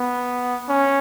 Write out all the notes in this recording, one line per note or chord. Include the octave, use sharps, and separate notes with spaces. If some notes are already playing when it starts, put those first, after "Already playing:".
Already playing: B3
C#4